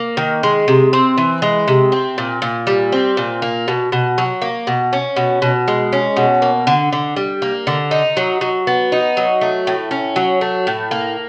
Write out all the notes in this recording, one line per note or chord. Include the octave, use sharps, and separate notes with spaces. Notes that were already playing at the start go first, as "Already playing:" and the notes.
Already playing: A#3
D#3
G#3
C3
C4
E3
G#3
C3
C4
A#2
A#2
G3
C4
A#2
A#3
B2
B2
F#3
A#3
B2
C#4
B2
B2
G#3
C#4
B2
A#3
D3
D3
G3
A#3
D3
D#4
F#3
F#3
B3
D#4
F#3
A3
A2
C#4
F#3
A3
A2
A#3